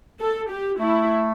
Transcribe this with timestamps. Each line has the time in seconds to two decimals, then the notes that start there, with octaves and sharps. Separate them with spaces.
0.21 A4
0.51 G4
0.79 A3 E4